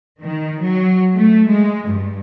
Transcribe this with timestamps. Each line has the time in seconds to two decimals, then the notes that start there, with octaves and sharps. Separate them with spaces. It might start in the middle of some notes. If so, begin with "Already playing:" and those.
0.22 D#3
0.61 F#3
1.16 A3
1.47 G#3
1.87 G2